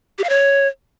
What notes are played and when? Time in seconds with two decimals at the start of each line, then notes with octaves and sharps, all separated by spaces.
0.18 G4
0.24 F5
0.29 C#5